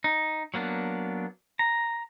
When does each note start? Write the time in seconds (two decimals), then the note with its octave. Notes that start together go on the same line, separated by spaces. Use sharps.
0.04 D#4
0.54 F#3 A#3 B3 D4
1.59 A#5